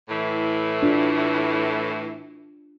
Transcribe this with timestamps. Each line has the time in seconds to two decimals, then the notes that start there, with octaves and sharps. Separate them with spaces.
0.09 A2 E3
0.83 D4 F4